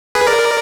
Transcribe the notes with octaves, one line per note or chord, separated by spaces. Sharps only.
G#4 B4
A#4 D5